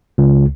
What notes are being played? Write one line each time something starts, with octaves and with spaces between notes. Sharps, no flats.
C#2